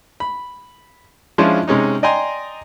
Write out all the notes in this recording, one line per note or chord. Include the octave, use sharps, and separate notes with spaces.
B5
F3 G#3 C#4 D4 E4 F4
C3 G#3 C#4 D#4
D5 D#5 G5 G#5 A#5 C6